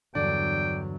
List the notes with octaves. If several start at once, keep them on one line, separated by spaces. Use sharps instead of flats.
E2 G2 D3 F#3 D4 D5 G5